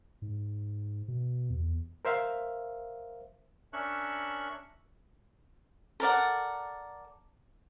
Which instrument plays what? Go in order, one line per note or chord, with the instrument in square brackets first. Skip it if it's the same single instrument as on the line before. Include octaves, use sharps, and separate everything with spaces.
[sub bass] G#2
B2
E2
[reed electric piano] A#4 C5 E5 F5
[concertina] C#4 D4 A#4 E5 C#6 F#6
[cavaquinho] A4 A#4 D5 F#5